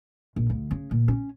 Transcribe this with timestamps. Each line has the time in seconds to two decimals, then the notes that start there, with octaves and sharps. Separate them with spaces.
0.36 A#1
0.50 D2
0.71 C#3
0.91 A#2
1.08 C#4